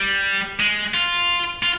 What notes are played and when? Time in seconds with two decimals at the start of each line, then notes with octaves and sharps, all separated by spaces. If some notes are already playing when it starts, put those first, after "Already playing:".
Already playing: G3
0.60 G#3
0.94 F4
1.63 F4